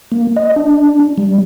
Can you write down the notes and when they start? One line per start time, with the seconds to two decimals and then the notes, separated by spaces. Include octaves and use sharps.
0.12 A#3
0.37 D#5
0.56 D4
1.18 G3